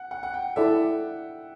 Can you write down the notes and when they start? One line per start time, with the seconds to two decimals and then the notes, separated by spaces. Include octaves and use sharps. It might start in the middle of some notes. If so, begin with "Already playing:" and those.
Already playing: F#5
0.11 F#5
0.23 F#5
0.34 G5
0.56 E4 A4 D5 E5